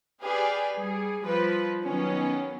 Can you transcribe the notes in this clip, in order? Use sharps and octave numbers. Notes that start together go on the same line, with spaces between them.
G4 G#4 B4 D5 F5
G3 G#4
F3 G3 B4
D#3 F#3 B3 C#4